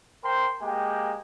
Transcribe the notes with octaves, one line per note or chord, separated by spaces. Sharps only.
A#4 C5 G5 C6
G#3 A#3 G4 G5